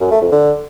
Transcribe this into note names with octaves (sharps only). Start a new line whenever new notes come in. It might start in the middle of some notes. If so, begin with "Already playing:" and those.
F#2
A3
F2
D3